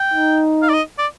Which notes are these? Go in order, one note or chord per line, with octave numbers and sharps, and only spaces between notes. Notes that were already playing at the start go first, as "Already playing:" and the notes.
Already playing: G5
D#4
F5
D5
D#5
D5